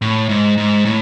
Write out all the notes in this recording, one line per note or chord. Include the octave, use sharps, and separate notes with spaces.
A2
G#2
G#2
A2